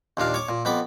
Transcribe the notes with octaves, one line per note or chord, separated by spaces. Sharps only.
D#2 A#2 D4 F5
C#5 D6
A#2
F2 B3 B5 D6